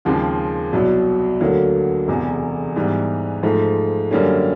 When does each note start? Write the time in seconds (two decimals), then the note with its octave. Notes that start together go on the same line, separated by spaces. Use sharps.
0.05 D#2 C#3 F3 G#3 C4
0.73 C2 B2 F#3
1.41 D2 D3 F#3 A#3
2.07 E1 E2 C3
2.76 G#2 E3 G3 B3
3.43 G#2 F3 A3
4.11 F#2 D3 G3 A#3 C#4